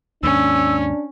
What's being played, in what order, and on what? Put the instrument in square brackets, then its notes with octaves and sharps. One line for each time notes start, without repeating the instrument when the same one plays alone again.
[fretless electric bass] D#2 G#2 [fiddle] C#4 [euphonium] D4 [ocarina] E6